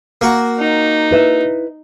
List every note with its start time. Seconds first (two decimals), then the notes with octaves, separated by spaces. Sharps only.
0.21 A#3 F#4
0.59 D#4
1.11 E4 B4 E5